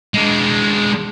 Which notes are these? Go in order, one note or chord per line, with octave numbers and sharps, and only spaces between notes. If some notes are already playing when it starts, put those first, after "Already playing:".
G#3 D4